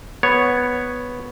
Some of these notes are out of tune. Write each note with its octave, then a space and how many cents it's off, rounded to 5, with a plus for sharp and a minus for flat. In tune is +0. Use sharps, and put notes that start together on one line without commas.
B3 +0 C#5 +0